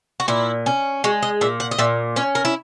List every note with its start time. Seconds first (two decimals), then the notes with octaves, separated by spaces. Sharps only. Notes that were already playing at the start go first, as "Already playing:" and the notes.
0.20 F#4
0.28 A#2 E4
0.66 C#4
1.04 G#3 F#4
1.22 D#5
1.41 A#2 E5
1.60 F#5
1.71 D#5
1.78 A#2 E5
2.16 C#4 C#5
2.35 A#4
2.45 E4